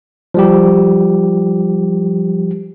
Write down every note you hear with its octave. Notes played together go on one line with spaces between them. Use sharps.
F3 G3 G4